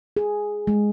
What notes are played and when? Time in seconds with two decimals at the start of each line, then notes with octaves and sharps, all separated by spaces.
0.17 G#4
0.67 G#3